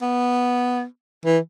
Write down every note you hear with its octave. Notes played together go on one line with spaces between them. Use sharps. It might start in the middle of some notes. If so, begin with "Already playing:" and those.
B3
E3